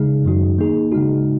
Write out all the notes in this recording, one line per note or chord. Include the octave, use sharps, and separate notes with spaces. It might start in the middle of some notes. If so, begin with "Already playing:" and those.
Already playing: C#3 G#3 D#4 G#4
F#2 D#3 F#3 D#4 F#4
D#3 A#3 D#4 G#4
C#3 G#3 D#4 F#4